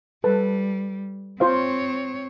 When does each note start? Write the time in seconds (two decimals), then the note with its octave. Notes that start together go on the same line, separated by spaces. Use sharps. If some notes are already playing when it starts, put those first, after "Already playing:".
0.24 G3 A4 B4 A5
1.40 C4 F4 C5 C#5 F5